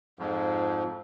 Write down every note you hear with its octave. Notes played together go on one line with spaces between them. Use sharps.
F2 G#2 F3